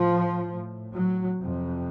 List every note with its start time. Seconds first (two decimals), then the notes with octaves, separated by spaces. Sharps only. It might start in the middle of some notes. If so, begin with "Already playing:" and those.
Already playing: A2 F3
0.51 A2
0.94 F#3
1.37 F2 C3